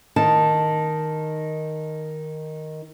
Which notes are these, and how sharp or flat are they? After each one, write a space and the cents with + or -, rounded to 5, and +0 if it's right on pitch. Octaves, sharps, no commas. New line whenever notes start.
D#3 +0 A5 +0